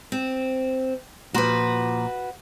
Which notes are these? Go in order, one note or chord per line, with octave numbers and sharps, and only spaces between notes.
C4
A#2 F3 F#4 B4